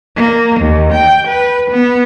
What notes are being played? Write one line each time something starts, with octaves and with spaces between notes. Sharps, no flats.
A#3
D#2
G5
B4
B3